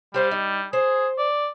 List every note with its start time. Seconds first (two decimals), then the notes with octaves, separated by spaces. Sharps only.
0.14 G3 G4 C5 F5
0.31 D#4
0.73 G#4 C5
1.18 D5